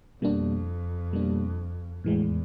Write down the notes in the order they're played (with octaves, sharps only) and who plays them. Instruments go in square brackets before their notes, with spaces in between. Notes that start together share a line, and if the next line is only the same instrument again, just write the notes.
[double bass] F2 [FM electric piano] B2 G3 A#3 D4
[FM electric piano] B2 G3 A#3 D4
[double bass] E2 [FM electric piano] A2 E3 G#3